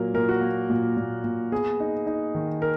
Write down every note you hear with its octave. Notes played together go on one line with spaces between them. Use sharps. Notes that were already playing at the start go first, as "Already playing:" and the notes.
Already playing: A#2 F#3 A#3 A#4
A#2 A#4
F#4
A#3
A#2
A#2
A#2
B3 G#4
D#4
D#4
D#3
A#4